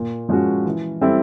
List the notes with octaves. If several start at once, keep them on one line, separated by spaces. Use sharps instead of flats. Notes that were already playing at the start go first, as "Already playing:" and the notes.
Already playing: A#2
F3 G#3 C#4 F#4
E3
G3 C4 E4 A4